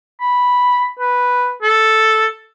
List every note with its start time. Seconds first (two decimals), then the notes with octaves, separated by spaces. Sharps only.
0.21 B5
0.99 B4
1.62 A4